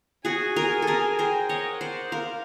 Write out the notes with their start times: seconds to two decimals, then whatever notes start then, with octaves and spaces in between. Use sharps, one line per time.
0.25 F#4 G#4 G#5
0.56 G#4 A#4
0.82 A4
0.87 G#4 A#4
1.18 A#4 C5 G5
1.49 C#5 D#5
1.65 F#5
1.81 C5 D5
2.12 A#4 C5 F5